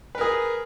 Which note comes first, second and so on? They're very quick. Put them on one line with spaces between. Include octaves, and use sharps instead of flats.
B4 A#4 G#4